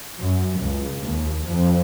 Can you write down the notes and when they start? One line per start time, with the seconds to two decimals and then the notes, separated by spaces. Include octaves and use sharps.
0.21 F#2
0.59 C#2
1.02 D#2
1.50 F2